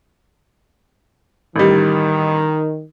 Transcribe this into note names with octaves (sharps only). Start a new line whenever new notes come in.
A1 D#3 G3